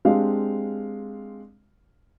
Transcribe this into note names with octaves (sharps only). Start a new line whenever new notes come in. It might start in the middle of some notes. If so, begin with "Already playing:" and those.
G#3 C4 D4 G4 F5